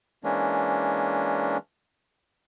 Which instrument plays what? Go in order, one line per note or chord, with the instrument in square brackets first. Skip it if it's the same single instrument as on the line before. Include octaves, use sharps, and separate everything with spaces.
[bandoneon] E3 G#3 A#3 C#4 D4